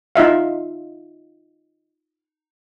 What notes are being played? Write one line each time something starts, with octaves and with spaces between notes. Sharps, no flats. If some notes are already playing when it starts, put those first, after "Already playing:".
D#4 F4 E5 F5